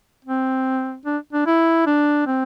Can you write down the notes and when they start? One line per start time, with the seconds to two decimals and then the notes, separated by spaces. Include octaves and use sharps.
0.25 C4
1.05 D4
1.33 D4
1.46 E4
1.86 D4
2.27 C4